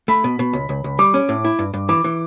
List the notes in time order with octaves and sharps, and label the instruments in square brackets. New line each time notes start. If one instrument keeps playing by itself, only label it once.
[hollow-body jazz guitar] A3 [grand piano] B5
[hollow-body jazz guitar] B2
B2
C#2
C#2
C#2
[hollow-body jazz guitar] G3 [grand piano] D6
[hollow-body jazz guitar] C#4
A2
E4
G2
G2
[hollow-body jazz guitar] E3 [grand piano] D6
[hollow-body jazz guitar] E3